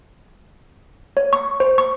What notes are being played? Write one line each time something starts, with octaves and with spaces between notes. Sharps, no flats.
C#5
C#6
C5
C#6